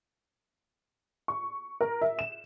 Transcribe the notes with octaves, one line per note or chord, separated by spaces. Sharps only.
C#6
A#4
E5
E7